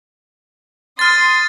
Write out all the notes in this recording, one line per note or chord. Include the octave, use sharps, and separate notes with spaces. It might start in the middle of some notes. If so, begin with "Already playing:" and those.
C6 D#6 F6 A6